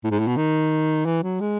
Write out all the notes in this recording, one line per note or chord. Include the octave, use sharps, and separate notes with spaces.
A2
G#2
A2
B2
D#3
E3
F#3
G#3